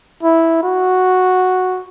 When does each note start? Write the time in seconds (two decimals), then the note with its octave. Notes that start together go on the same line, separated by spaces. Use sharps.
0.23 E4
0.63 F#4